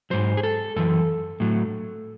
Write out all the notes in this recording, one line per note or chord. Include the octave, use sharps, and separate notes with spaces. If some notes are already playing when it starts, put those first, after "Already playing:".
G#2 F#3 C5
G#4
A4
F#2 E3 A4
A2 F#3